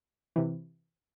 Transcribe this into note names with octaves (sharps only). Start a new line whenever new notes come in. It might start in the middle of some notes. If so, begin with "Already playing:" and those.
C3 E3